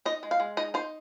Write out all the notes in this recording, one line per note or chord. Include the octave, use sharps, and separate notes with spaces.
D#4 D#5
G#3
F5
G#3
D#4 D#5
D#4 C5